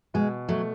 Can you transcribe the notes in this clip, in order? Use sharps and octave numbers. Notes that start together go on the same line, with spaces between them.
B2 G#3
F#3 A3